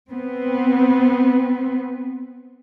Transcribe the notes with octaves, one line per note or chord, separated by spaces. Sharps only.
B3 C4